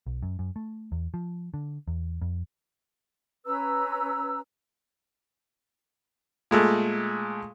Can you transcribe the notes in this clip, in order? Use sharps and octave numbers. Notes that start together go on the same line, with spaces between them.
B1
F#2
F#2
A3
E2
F3
D3
E2
F2
C#4 B4 A#5 E6
A#2 G#3 A3